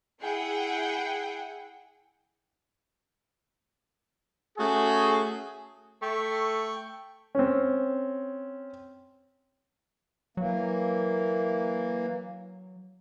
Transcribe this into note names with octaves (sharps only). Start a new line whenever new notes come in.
E4 G#4 F#5 G5
A3 C#4 F#4 G#4
A3 G5 C#6
C4 C#4
E3 F#3 A#3